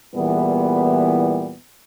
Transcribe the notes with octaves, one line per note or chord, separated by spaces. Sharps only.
E2 A#2 E3 G3 B3